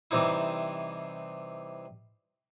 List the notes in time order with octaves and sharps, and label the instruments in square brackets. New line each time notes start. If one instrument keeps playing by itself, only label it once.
[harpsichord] C3 E3 G3 C4 D#4 E4